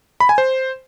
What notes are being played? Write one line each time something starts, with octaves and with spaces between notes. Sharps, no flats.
B5
G#5
C5